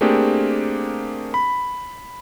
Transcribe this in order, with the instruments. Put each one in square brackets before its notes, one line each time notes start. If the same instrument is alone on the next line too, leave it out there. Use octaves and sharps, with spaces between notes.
[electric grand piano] A3 A#3 C4 D4 G4 G#4
B5